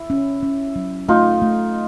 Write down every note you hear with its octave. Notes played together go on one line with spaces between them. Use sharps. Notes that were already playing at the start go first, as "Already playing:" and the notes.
Already playing: E4
C#4
C#4
F#3
A3 D#4 F4
A3